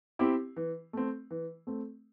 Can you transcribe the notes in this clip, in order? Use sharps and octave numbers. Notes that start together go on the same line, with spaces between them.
C4 E4 G4
E3
A3 C4
E3
A3 C4